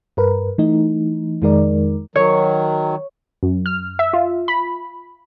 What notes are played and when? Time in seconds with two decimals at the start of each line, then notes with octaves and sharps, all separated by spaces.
0.17 G2 A#4 B4
0.58 E3 A3 D#4
1.42 F2 D#3 G#3 D#4 A#4 D5
2.16 D#3 F#3 C#5
3.43 F#2
3.66 F6
3.99 E5
4.13 F4
4.48 B5